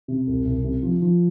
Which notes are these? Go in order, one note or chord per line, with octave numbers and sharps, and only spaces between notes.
C3
C2
C2
C3
F3
F3